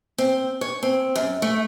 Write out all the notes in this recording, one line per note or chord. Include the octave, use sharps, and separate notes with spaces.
C4
C#5
C4
F#2
A3